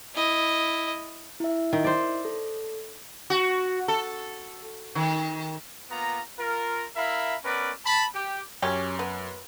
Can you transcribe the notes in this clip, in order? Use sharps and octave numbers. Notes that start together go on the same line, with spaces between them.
E4 D#5
E4 E5
D#3
C5 D5
A4
F#4
A4
D#3
A#3 B3 F4 A#5
F4 A#4
E4 A#4 E5 F5 B5
B3 C#4 A#4 B4 D5
A5 B5
G4
F#2 C#4 G4
B3